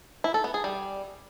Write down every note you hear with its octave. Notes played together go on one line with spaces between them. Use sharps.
E4
A4
B3
G#4
G3